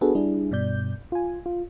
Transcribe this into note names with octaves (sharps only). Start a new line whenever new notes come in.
B3 D4 F#4 G#4 A4 B4
G3 D4 E4 G#4
G2 B2 D5 G6
F4 G#5
F4